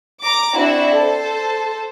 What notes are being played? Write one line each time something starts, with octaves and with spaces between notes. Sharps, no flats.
A#5 D6
C4 D4 E4 F#4 E5
A4 C5